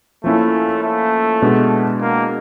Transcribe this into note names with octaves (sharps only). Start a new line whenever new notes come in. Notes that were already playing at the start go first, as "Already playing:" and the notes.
F3 A3 A#3 C#4 E4
A3
B2 G#3 B3 D4
A#3